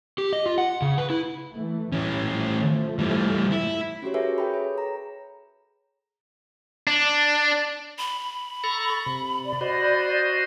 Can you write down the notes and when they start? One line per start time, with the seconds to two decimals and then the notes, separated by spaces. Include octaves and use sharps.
0.18 G4
0.33 D#5
0.46 F4
0.58 F#5
0.82 C#3
0.98 B4
1.10 E4
1.53 E3 A3
1.92 A2 E3 G3 C#4
2.26 F3 A3
2.99 E3 G3
3.51 E4
4.02 C#4 F#4 G4 C#5
4.14 G#4 A#4 B4 C#5 E5 G#5
4.38 A4 B4 G5 A5 B5
4.51 G#4 C#5
4.78 A#5
6.87 D4
7.98 B5
8.64 A4 A#5 C#6
9.06 C3
9.45 D5
9.61 F#4 C5 D#5